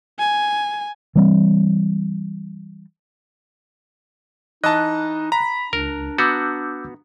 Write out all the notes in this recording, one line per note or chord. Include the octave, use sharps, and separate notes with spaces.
G#5
E3 G3 C4
E3 D#4 D#5 A5 F#6
A#5 B5
C#2 D4 A#4
B3 F#4 D6 E6 G6